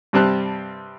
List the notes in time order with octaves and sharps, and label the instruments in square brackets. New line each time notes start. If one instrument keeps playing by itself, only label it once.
[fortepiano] G2 C3 G3 C4 A5 F#6